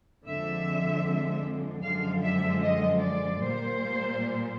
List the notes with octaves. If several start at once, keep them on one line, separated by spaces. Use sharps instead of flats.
F2 D3 F3 G#3 E5
F#2 D3 F3 G#3 F5
E5
D#5
D5
A#2 G3 A#3 C5